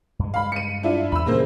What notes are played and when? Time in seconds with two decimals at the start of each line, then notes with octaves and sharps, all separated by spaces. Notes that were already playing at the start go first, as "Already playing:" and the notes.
0.19 G2 G#3
0.34 F5 B5
0.52 C#7 D#7
0.83 D4 E4 F4
1.12 E2 B5 E6
1.26 A#2 C#3 E3 G3 A#3 C5